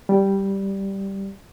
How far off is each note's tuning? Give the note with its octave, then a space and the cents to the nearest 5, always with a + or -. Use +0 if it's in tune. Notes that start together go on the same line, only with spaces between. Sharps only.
G3 -5